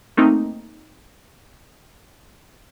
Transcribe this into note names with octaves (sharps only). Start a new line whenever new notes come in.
A3 A#3 C4 D#4